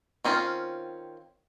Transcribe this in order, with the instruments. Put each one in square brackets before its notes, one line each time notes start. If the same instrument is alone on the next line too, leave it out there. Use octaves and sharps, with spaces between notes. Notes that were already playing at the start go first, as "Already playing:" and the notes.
[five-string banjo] D#3 C4 C#4 E4 F4